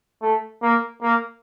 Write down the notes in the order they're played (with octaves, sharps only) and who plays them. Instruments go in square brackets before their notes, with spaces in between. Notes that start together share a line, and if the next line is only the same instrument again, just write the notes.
[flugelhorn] A3
A#3
A#3